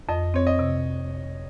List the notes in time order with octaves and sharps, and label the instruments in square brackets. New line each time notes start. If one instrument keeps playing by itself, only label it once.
[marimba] F2 [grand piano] D#5
[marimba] C4 [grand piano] C#5
[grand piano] D#5
[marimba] C3